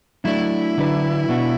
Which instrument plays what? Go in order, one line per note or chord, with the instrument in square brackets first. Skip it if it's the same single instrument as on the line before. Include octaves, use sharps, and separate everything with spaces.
[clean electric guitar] F#3 A3 D4 [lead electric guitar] E4
[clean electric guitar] D3 F#3 D4 B4
B2 B3 D4 F#4